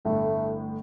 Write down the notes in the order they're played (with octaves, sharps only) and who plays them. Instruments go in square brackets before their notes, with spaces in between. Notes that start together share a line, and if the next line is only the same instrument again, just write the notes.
[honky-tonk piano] G1 A2 [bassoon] A3